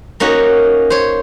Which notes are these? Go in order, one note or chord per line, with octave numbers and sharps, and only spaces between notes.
A#3 C#4 D#4 F#4
C5 C#5